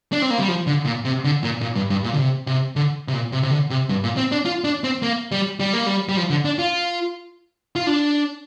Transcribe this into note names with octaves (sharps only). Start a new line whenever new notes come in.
D4
C4
A#3
G3
F3
D3
A#2
C3
D3
A#2
A#2
G2
G2
A#2
D3
C3
C3
D3
C3
A#2
C3
C3
D3
C3
G2
A#2
C4
D4
F4
D4
C4
A#3
G3
G3
A#3
G3
G3
F3
D3
D4
F4
F4
D4